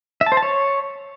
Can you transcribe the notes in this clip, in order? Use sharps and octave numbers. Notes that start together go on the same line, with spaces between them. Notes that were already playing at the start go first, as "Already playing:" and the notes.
E5
A5
C5
A5
C#5